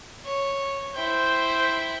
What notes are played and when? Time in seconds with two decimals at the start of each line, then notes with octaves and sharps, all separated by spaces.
0.24 C#5
0.95 E4 C5 G5